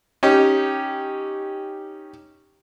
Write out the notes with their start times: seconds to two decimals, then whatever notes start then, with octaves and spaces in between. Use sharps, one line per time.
0.23 C#4 D#4 G4